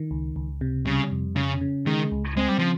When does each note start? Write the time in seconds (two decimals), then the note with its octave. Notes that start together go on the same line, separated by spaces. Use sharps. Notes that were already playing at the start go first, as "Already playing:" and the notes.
Already playing: D#3
0.11 C#2
0.36 C#2
0.61 C3
0.86 C#3 G3
1.12 F2
1.37 C#3 C#4
1.61 C#3
1.86 D#3 G#3
2.12 C#2
2.37 G#3 C4
2.49 G3
2.59 C#3 F3